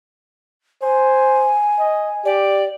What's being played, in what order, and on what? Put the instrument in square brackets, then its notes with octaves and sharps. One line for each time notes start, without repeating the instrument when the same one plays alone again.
[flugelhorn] C5 [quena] G#5
[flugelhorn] D#5
[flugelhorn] G4 [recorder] D5